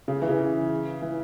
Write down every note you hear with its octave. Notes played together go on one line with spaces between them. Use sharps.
C#3
E3
C#3
E3